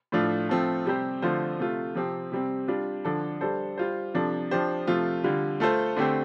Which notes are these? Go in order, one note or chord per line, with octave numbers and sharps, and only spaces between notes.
A2 F3 A3 D4 F4
F3 A3 C4 F4 A4
C3 G3 C4 G4 C5
D3 F3 A3 F4 C5
C3 A3 F4
C3 F3 C4 G4
C3 G3 C4
G3 D4 F4
D3 F3 D4 A4
G3 D4 A4 C5
G3 F4 C5
C3 F3 D4 A4
F3 D4 G4 C5
C3 F3 A3 F4
D3 G3 F4
A3 F4 A4 C5
D3 A3 C4 G4 C5